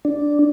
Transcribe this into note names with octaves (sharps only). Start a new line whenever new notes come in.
D4